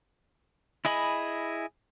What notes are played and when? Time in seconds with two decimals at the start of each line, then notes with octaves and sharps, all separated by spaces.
0.85 E4 G#4 D#5 G#5 B5